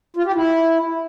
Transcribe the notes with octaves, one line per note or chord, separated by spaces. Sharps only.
F4
G4
E4